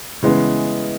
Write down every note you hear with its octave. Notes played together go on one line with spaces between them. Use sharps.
C#3 E3 G#3 B3